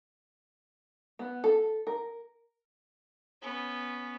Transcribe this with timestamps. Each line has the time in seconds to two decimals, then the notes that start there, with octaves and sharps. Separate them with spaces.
1.19 B3
1.44 A4
1.87 A#4
3.42 B3 C#4